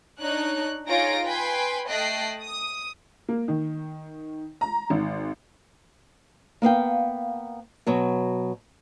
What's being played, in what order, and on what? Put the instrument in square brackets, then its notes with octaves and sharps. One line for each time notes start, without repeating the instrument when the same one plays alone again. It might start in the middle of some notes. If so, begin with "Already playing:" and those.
[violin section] D4 D#4 C#5 F#6
D#4 F4 G#4 C#5 A#6 D7
B4 G5 G#5 B5 C6
A3 D#5 G5 A5 F#6 C7
D#6
[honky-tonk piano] A#3
D#3
A#5
G#1
[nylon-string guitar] A#3 B3 F5 G5
B2 F#3 F#4